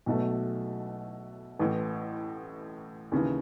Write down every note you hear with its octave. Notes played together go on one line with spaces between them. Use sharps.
B1 B2 F#3 A3
A1 A2 E3
D#2 C#3 E3